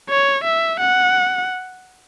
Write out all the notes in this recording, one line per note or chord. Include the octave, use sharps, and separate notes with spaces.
C#5
E5
F#5